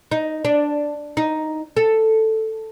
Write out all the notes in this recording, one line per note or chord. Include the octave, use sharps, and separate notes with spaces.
D#4
D4
D#4
A4